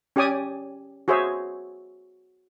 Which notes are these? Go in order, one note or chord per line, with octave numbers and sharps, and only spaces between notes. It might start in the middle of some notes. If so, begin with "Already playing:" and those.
C#4 G4 D5 G#5 D6 D#6
F#4 G#4 C5 C#5 E5